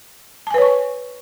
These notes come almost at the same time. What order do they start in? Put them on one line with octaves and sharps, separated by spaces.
A5 G#5 B4 C#5 C#6